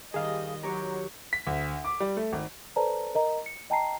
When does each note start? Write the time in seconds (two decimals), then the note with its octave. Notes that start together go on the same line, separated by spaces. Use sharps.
0.14 D#3 G3 G#4 D#5 F5
0.63 F#3 G4 C#5 A#5
1.33 B6
1.47 D2
1.85 D6
2.00 G3
2.17 A3
2.33 G#1
2.76 A4 B4 C5 D5 A5 A#5
3.15 A#4 D#5 A#5
3.46 C#7
3.70 D#5 G5 A5 A#5 C7